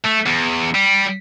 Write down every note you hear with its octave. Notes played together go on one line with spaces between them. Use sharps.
A3
E2
G3